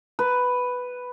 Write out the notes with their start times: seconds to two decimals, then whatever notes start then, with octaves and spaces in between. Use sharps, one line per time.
0.19 B4